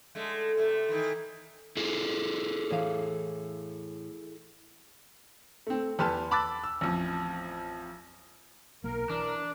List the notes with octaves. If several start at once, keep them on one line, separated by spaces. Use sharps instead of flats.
D3 G#3 A3
C3 A3
D#3 E3
E4 G#4 A4
A2 E3 F5
A3 C4
E2 G4 B4 A5 C6 F6
A5 B5 D6 E6 F#6 A6
E6
A1 F2
B1 A#3 A#4
E3 D4